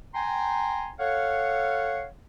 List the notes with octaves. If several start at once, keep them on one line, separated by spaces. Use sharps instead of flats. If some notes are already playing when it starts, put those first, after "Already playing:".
G5 G#5 A#5 C6
A4 C#5 F5 F#5